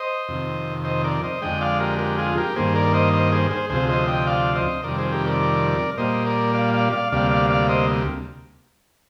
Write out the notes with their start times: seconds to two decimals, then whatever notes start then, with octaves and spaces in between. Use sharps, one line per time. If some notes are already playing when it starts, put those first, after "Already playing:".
Already playing: C5 D#5
0.28 F2 C3 D#3
0.85 C5 D#5
1.04 A#4 D5
1.23 C5 D#5
1.42 F2 D3 G#3 D#5 G5
1.61 D5 F5
1.80 G4 A#4
1.99 G4 A#4
2.18 F4 G#4
2.37 G4 A#4
2.56 G2 D#3 A#3 G#4 C5
2.76 A#4 D5
2.94 C5 D#5
3.13 C5 D#5
3.32 G#4 C5
3.51 G#4 C5
3.70 D2 C3 F3 G#4 C5
3.89 C5 D#5
4.08 D#5 G5
4.27 D5 F5
4.55 C5 D#5
4.84 F2 C3 D#3 G3 A#4 D5
4.98 G#4 C5
5.12 G4 A#4
5.26 A#4 D5
5.98 A#2 G3 A#3 C5 D#5
6.26 A#4 D5
6.55 D5 F5
6.74 D5 F5
6.92 D5 F5
7.12 D2 C3 G3 A#3 D5 F5
7.31 D5 F5
7.50 D5 F5
7.69 C5 D#5